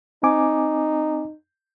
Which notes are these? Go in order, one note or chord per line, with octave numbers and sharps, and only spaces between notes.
C4 D#4 G#5 D6